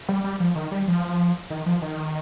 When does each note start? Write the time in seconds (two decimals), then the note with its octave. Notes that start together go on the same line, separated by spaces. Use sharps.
0.09 G3
0.24 G3
0.40 F3
0.56 D#3
0.72 G3
0.88 F3
1.50 D#3
1.66 F3
1.82 D#3